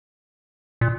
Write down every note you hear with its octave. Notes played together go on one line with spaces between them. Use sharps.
A#2